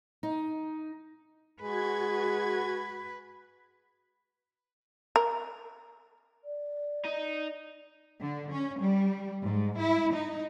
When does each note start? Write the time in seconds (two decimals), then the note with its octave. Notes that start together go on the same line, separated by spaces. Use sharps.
0.23 D#4
1.62 G#3 F#4 B4 G#6
5.16 A#4
6.45 D5
7.04 D#4
8.21 D3
8.51 C#4
8.80 G3
9.44 G#2
9.79 E4
10.13 D#4